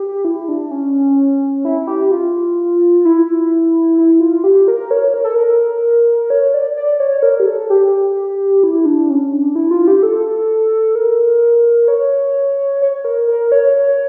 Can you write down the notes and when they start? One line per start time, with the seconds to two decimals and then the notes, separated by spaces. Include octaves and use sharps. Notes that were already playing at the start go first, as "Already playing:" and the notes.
Already playing: G4
0.25 E4
0.49 D4
0.71 C#4
1.65 E4
1.87 G4
2.12 F4
3.05 E4
3.98 E4
4.20 F4
4.44 G4
4.68 A#4
4.91 C#5
5.14 A#4
5.24 A4
5.35 A#4
6.30 C#5
6.54 D5
6.77 D5
7.00 C#5
7.23 A#4
7.40 G4
7.46 A4
7.70 G4
8.63 E4
8.86 D4
9.10 C#4
9.33 D4
9.55 E4
9.71 F4
9.88 G4
10.03 A4
10.95 A#4
11.88 C#5
12.82 C#5
13.05 A#4
13.28 A#4
13.52 C#5